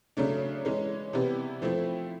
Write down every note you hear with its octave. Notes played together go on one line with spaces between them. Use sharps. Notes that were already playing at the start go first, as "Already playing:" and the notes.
C#3 F#3 A3 D4
E3 G#3 C#4
C3 E3 G3 B3 E4
F3 A3 C4 E4